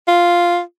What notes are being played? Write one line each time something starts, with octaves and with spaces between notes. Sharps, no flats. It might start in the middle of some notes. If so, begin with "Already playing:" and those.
F4